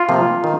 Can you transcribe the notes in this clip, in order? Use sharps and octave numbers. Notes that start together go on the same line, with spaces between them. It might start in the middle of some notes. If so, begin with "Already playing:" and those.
Already playing: F4
C3 F3 A#3
D#3